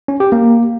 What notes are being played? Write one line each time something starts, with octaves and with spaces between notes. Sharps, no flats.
C#4
G4
A#3